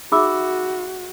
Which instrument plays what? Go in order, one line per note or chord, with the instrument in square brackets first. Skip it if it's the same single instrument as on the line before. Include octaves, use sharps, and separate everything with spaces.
[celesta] D#4 B5 E6 [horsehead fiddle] F#4 [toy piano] G#4 E5 D6